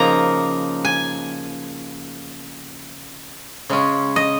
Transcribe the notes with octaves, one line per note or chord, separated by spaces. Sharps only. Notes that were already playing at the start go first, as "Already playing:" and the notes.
Already playing: C#3 F3 A#3 D#4 A#5
G#5
C#3 G#3 C#4
D#5